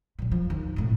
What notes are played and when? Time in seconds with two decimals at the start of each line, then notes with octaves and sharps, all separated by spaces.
0.19 A#2 F#3
0.32 F3
0.50 D#2
0.76 A2 C3